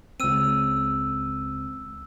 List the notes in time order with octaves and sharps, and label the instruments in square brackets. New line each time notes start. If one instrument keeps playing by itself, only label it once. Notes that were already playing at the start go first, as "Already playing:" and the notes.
[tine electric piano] C#2 C4 [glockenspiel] E6 D#7